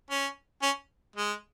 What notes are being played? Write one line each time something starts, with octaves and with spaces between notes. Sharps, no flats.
C#4
C#4
G#3